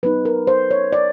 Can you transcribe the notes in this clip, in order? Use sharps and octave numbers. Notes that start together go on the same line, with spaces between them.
F#3 B3 D#4 B4
A#4
C5
C#5
D5